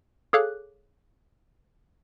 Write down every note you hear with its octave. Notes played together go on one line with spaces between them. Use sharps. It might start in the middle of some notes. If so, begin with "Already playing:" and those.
G#4 A4 C#5 F5 D6 F#6